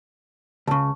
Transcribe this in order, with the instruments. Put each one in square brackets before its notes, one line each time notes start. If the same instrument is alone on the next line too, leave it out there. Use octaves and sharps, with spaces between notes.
[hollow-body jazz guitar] C#2 C#3 [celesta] A5 C#6